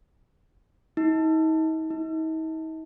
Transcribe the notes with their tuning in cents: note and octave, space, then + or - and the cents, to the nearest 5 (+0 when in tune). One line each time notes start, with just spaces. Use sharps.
D#4 +40
D#4 +45